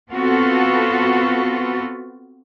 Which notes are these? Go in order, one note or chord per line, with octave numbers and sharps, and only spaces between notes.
B3 C4 F4 F#4 A4 B4